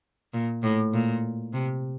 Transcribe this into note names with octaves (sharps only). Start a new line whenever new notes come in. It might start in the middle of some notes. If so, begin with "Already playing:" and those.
A#2
A2
A#2
C3